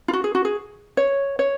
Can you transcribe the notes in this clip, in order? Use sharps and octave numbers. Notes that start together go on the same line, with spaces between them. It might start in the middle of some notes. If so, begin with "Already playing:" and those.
F4
F#4
G#4
F#4
G#4
C#5
C#5